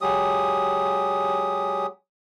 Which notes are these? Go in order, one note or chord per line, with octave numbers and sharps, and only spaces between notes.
F#3 G#3 G4 D#6